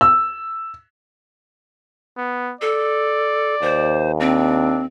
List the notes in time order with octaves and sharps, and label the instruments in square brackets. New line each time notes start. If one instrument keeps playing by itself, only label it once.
[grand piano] E6
[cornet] B3
[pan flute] A4 [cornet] D5
[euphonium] D#2 [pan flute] C5
[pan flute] C4 [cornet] D4